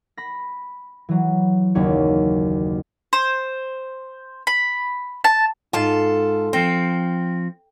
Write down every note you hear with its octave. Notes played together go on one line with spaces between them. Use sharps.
B5 A#6
E3 F#3
F#1 D#2 C#5
C5
B5
A5
G#2 F4 A4 A5
F3 C4 G5